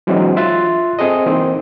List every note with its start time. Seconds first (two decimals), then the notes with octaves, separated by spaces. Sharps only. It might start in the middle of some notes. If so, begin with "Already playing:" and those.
0.07 E3 F#3 G#3 C4 D4 D#4
0.36 F4 E5 C6 F#6 A6
0.99 C4 G#4 A4 D#5
1.26 E3 A#3 C4 D#4